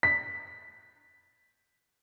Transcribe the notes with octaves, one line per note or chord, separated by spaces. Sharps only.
B6